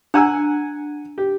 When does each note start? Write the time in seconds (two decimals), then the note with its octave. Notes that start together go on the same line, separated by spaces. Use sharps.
0.14 D4 F#5 G#5 A#5 E6
1.18 G4